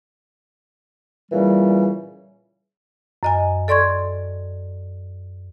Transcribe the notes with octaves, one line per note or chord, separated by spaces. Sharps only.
A#2 C#3 E3 G3
F#2 D#5 G#5
A4 D5 C6 C#6 G#6